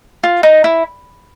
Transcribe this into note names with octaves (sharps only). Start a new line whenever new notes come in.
F4
D#4
E4